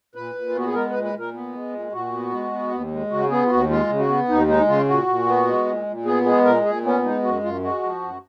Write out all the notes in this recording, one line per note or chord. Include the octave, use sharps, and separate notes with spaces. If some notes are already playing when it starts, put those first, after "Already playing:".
A#2 B4
A#2
F4
B3 F#4
G#4
G#3 A#4
A#2 B4
B4
A#2 A#4
B3
G#3
A#2
A#2 F#4
B3
G#3
B3
D#2
G#3
C#3 F#4
B3 G#4
F4
D#2 F#4
G#3 F4
C#3
F#4
B3
D#2 D#4
G#3 D#4
C#3 F4
A#2 F#4
A#2
B3
G#3
A#2
A#2
B3 G#4
G#3 G#4
A#2 A#4
A#2 G#4
B3 C#4
G#3 D#4
F#2 F#4
F#2 F4
G#3 F#4
F3
F#2